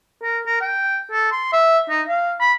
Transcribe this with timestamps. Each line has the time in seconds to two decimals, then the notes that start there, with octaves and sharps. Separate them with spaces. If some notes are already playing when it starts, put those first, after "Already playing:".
0.23 A#4
0.47 A#4
0.61 G5
1.12 A4
1.32 C6
1.53 E5
1.89 D#4
2.09 F5
2.40 B5